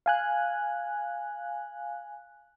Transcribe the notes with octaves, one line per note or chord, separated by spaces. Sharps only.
F5 G#5 F#6